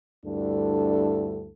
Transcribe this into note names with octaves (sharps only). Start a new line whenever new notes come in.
D2 G2 D4 E4 A4